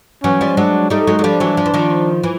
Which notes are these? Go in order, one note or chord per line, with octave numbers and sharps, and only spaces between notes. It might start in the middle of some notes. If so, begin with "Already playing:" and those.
E3 F#3 C#4
F3 G3
F#3 G#3 D4
G3 A3 D#4
F#3 G#3
F#3
F3 G3 D4
E3 F#3
F3
E3
D#3 F3
E3